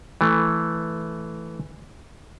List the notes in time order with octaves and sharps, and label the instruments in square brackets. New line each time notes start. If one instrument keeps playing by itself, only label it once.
[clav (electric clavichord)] E3 A3